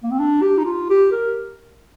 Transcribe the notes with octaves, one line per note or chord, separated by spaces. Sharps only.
A#3
C4
D4
G4
D#4
F4
G4
A#4